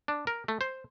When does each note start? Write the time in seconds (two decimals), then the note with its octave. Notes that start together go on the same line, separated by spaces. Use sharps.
0.08 D4
0.27 A#4
0.48 A3
0.61 C5